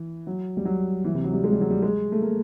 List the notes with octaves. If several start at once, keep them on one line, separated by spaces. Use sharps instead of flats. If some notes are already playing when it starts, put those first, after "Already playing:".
Already playing: E3
F#3
G3
F#3
E3
C3
F#3
G3
G#3
G3
F#3
G3
G#3
A3
A#3